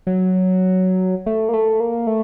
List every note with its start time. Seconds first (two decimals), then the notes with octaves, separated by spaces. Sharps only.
0.07 F#3
1.26 A3
1.49 A#3
1.54 A3
1.80 A#3
2.07 A3